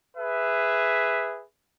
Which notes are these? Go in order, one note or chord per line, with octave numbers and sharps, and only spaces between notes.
G#4 B4 E5